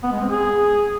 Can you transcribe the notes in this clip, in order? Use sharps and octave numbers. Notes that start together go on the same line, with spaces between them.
B3
G#3
C4
G#4